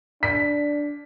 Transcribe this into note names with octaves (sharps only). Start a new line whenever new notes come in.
D4 B6